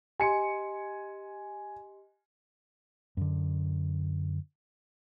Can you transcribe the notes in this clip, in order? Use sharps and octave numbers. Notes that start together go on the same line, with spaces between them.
G4 D#5 G#5 C6 C#7
F#2 D3